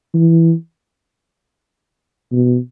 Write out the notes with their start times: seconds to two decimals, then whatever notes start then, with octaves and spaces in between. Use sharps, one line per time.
0.14 E3
2.32 B2